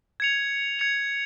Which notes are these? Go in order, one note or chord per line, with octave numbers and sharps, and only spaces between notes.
G#6 C#7 F7
G#6 C#7 F7